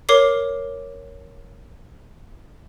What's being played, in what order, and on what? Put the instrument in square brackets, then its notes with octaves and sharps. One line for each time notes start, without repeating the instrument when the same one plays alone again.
[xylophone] A#4 C#5 D6 C7